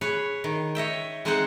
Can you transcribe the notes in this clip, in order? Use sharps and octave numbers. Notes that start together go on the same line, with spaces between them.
G#4 B4 C#5
D#3
C#5 D#5 E5 G5
G#3 C4 D#4 G#4 C5 F#5